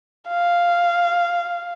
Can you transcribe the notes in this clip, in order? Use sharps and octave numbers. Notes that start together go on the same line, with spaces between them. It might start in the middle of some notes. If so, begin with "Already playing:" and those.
F5